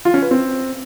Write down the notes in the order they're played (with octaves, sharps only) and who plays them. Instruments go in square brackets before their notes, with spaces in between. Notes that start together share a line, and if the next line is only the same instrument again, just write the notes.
[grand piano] F4
C#4
B4
C4